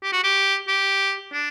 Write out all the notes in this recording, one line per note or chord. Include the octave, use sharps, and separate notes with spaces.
G4
F#4
G4
G4
D4